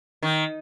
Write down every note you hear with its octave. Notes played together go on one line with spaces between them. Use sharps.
D#3